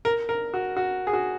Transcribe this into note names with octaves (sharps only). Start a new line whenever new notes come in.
A#4
A#4
F#4
F#4
G#4
F#4